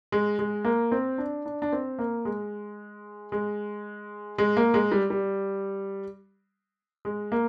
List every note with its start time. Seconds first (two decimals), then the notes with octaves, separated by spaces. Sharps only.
0.12 G#3
0.39 G#3
0.65 A#3
0.92 C4
1.18 D4
1.46 D4
1.62 D4
1.72 C4
1.99 A#3
2.25 G#3
3.32 G#3
4.38 G#3
4.57 A#3
4.74 G#3
4.92 G3
5.10 G3
7.05 G#3
7.32 A#3